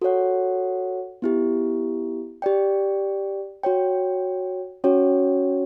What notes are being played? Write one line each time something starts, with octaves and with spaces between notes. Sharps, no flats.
F#4 A4 C#5 F#5
B3 E4 G4
G4 D5 G5
F#4 C#5 G5
C#4 F#4 C#5 G5